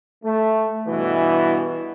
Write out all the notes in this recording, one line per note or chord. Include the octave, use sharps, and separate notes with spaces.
A3
G2 B2 E3